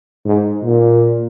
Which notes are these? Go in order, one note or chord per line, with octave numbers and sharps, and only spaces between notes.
G#2
A#2